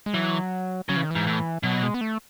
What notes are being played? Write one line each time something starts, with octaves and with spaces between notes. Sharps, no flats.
G#3
E3 F#3
C#3 F#3
E3
D#3
G#2 E3
A2
B2 F#3
G#3
B3
A3